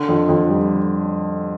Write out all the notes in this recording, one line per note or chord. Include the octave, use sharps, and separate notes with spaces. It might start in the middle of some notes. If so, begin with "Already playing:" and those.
Already playing: D3
F2
F2
G3